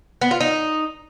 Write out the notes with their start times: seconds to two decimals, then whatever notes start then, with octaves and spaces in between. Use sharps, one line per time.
0.21 B3
0.31 F4
0.40 D#4